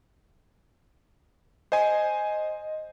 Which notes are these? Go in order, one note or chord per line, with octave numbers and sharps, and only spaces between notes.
C5 D#5 G#5